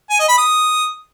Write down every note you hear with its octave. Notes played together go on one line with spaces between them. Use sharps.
G#5
D#5
B5
D#6